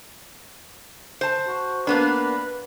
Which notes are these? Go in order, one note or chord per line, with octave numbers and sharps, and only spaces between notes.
C5 A5
F#4
A#3 B3 D4 B4